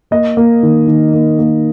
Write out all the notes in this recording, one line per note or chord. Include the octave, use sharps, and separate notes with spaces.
A#3 D#5
A#3
D#3
D#3
A#3
A#3